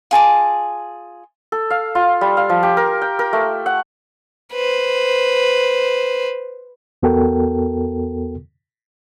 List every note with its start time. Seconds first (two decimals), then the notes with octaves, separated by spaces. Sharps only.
0.11 F4 G#4 A5 D6
1.52 A4
1.70 F5
1.95 F4
2.21 G3
2.37 F5
2.49 F3
2.63 G4
2.77 A#4
3.02 G5
3.19 A#4
3.33 A3
3.66 F#5
4.54 B4 C5
7.03 E2 B3 F#4 A4 A#4 G5